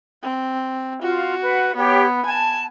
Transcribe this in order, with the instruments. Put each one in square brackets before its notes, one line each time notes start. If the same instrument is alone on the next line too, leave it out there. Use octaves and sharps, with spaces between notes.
[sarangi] C4
[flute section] F4 [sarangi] F#4
[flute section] B4 F#5
[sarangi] B3 [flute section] G4 C#5
[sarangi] G#5 [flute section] A5